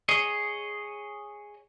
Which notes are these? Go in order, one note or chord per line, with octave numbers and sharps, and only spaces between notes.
G#4 C#5 D#5